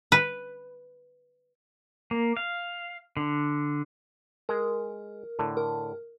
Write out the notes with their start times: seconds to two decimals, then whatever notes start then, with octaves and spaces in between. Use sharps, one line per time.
0.12 B4
2.11 A#3
2.37 F5
3.17 D3
4.49 G#3 G#4 A#4
5.39 A2 D3
5.57 A#4